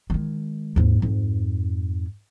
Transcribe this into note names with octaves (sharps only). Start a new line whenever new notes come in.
D#3 G#3
D#2 G#2
F2 G#2